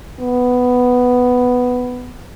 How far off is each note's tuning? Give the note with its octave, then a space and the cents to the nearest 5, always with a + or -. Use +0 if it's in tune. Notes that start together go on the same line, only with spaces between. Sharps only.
B3 +5